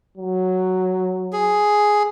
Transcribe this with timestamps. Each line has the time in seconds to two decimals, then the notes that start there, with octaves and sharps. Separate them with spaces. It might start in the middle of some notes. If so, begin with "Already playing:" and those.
0.18 F#3
1.33 G#4